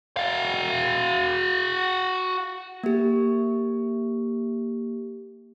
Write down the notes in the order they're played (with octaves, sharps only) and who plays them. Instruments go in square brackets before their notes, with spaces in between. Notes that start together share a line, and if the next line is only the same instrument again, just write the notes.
[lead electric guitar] F#4 F5
[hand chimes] A#3 G4